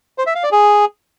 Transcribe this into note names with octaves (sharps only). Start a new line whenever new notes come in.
C5
E5
F5
D5
G#4